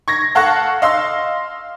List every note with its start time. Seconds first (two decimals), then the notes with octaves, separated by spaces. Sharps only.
0.08 C#6 G#6 A#6
0.35 A4 F5 F#5 A5 C#6 F#6
0.82 D#5 F5 C6 E6